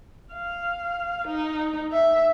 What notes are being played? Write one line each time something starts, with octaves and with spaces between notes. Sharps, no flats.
F5
D#4
E5